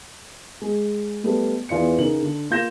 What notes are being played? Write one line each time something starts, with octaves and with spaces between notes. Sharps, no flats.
G#3
G3 A3 B3
E2 E3 F4 D5 C#7
C#3 D#4 A#4 F#7
D3
A#3 F4 G6 A#6 E7